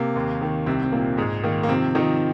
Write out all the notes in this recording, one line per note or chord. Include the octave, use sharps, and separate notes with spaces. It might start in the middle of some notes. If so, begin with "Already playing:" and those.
Already playing: C3 A#3
D#2
D#3
C2 C3 C4
C4
A#2 A#3
G#2 G#3
D#3 A#3
A#3
C3 F3 C4
D#3 F3 D#4